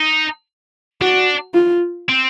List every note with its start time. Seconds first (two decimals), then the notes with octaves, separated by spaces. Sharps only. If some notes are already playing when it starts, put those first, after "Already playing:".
Already playing: D#4
1.01 D4 F#4
1.54 F4
2.09 C4